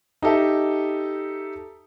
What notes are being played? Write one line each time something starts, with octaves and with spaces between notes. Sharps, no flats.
D#4 G4 A4 E5